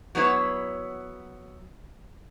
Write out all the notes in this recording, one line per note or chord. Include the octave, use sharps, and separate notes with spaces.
F#3 B3 E4 C#5